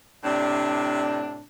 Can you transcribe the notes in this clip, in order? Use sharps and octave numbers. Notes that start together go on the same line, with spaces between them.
A2 C3 D4